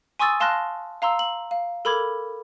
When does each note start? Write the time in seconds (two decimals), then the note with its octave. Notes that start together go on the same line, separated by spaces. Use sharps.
0.19 G#5 C6 C#6 D#6 E6 A6
0.40 F5 A5 C6 F6 F#6 A#6
1.02 F5 A#5 C6 E6
1.19 F#7
1.51 F5
1.85 A4 A#4 B5 D6 G#6